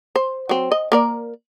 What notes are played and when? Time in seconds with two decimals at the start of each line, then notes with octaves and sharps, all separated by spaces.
0.16 C5
0.49 F#3 C4
0.72 D#5
0.92 A#3 A#4 D5